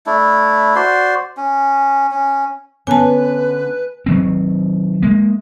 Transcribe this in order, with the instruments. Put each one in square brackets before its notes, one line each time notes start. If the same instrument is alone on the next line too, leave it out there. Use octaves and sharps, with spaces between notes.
[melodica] A3 D4 E4
F#4 C5 D5 C6
C#4
C#4
[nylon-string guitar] D3 B3 C#4 [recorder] B4 [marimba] G#5 A5
[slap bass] D#3 F#3 C4
G#3 A#3